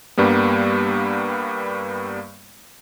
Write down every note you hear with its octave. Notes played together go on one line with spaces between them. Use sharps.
G2 G3 A#3 B3